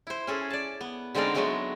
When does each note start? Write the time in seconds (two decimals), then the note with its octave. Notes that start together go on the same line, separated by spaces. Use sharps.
0.07 E4 C5
0.27 C#4 G#4 A4
0.50 D5 A5
0.81 B3
1.15 D3 G#3 C4 D#4 D5 F5
1.34 D3 F#3 G#3 A3 B3 D#4